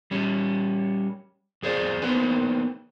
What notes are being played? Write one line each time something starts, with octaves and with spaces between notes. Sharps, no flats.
G3 C#4
F2 G#4 C5 D5
A#3 B3 D#4 B4 C5